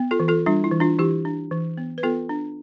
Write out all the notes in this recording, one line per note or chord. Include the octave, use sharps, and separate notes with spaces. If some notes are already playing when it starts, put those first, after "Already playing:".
Already playing: B3
F4 A4
E3
F4 A4
G3 D4 F4
E4
E3
D4 F4
E3 E4 G4
D4
E3
B3
B4
B3 F4 A4
D4